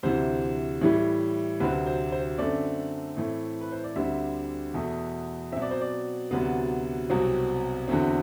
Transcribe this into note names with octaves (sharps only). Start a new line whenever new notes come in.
D2 C3 E3 C5
A2 E3 G3
D2 C3 F#3 C4 B4
C5
C5
F#2 D3 A3 C4 D5
A2 E3 A3 C4
B4
C5
D5
D2 D3 G3 C4 E5
E2 B2 A3
B2 F#3 C4 E5
D5
C5
D5
D2 C3 F#3 B3
C2 B2 F#3 C4
E2 D3 F#3 A3 C4